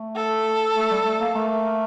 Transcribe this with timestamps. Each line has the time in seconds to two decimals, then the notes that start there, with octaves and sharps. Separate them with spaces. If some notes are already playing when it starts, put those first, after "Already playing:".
Already playing: A3
0.16 A4
0.75 A3
0.91 G3
1.05 A3
1.21 A#3
1.35 A3 A#3